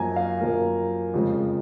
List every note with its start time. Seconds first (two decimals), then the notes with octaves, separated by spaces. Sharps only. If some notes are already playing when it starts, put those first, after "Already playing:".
Already playing: F#2 F3 A#3 G#5 A#5
0.16 F5
0.40 F#2 F3 A#3 A#4
1.14 F2 C#3 F3 G#3